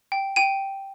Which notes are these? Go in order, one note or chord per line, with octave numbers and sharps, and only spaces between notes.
G5
G5 D#7